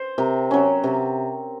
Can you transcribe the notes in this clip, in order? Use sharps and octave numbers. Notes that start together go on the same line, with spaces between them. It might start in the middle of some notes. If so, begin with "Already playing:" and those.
Already playing: C5
C3 A#4
F#3 C#4
C3